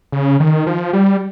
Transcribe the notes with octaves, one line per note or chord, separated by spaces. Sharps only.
C#3
D#3
F3
G3